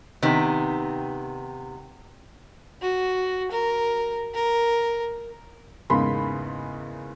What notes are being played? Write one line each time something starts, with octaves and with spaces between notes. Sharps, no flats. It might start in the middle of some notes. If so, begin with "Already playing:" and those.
C3 D#3 B3
F#4
A#4
A#4
E2 G#2 C#3 A#3 B5 C6